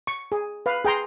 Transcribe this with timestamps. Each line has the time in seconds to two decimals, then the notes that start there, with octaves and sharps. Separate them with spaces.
0.07 C#6
0.32 G#4
0.66 B4 F5
0.85 G#4 G5 A#5 C6